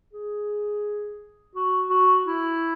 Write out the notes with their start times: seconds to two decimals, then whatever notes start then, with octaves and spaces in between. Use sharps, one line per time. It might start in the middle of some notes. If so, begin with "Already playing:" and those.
0.13 G#4
1.56 F#4
1.90 F#4
2.26 E4